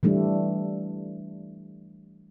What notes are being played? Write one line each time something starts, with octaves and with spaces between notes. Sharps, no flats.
E3 G3 A3 D4